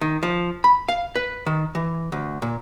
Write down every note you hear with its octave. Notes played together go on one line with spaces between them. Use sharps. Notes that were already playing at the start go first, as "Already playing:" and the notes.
D#3
F3
B5
F5
B4
D#3
E3
D2
A#2